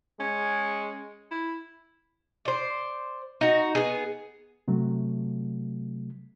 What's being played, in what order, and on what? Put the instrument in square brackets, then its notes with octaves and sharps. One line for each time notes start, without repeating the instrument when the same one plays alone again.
[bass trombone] G#3 [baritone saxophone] C#4
[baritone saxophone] E4
[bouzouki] C5 D5
D#4 F#4
B3 G#4
[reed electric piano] C3 F#3 A3